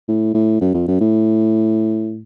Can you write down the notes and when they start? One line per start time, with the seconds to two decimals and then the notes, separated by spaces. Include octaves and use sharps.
0.08 A2
0.34 A2
0.61 F#2
0.74 F2
0.88 F#2
1.01 A2